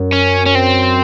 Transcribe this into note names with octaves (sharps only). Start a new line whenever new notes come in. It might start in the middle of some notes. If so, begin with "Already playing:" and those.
Already playing: F#2
C#4
C#4
C4